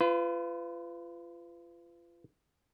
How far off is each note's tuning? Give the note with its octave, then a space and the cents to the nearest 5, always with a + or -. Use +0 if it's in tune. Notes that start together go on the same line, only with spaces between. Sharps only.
F4 -25 B4 +30